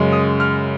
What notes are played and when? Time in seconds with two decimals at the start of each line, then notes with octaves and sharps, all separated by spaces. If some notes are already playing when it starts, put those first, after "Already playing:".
Already playing: F#2 C#3 G#3
0.12 D#6
0.40 F6